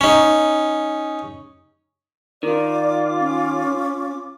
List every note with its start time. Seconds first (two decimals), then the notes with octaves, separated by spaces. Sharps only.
0.01 C#4 D#4
2.43 D#3 F4 D5 D6
3.20 C#4